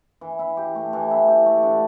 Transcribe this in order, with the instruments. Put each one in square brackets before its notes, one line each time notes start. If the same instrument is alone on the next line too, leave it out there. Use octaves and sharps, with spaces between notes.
[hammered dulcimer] E3
E4
G4
A3
E3
E4
G4
A3
D3